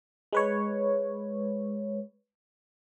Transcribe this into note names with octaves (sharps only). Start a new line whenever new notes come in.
G#3 B4 C#5